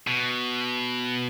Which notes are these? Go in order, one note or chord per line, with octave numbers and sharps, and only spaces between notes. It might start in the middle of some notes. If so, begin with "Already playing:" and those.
B2